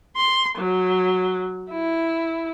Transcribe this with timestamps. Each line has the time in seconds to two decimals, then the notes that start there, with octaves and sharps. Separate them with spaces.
0.16 C6
0.58 F#3
1.71 E4